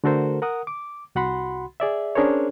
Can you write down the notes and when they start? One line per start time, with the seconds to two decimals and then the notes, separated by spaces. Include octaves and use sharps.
0.04 D3 A3 F#4 A4 A#4 C5
0.42 A#4 F#5 D#6
0.67 D6
1.15 C2 F#4 F#5 B5 C6
1.80 G#4 D5 E5
2.15 C#4 D4 G#4 A#4 C5 C#5